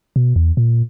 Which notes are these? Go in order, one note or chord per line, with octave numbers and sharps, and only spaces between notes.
B2
E2
A#2